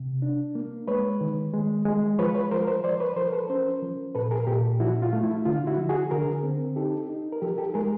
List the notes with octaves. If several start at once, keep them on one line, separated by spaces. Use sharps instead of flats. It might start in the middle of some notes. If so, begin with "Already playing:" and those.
Already playing: C3
D4
A#3
G#3 B4 C#5
D#3
G#3
G#3
F3 B4 C#5
B4 C#5
F3 A#4 C5
A#4 C5
F3 C5 D5
B4 C#5
F3 A#4 C5
A4 B4
C#4 A#4 C5
F3
A#2 A4 B4
G#4 A#4
A#2 G4 A4
F3 E4 F#4
F4
A3
E4
D3 F4
E4 F#4
F3
F#4 G#4
D3 G#4 A#4
C4
D#4 G4 A4
D#4
A#4
F3 G4 A4
G4 A4
G#3 G#4 A#4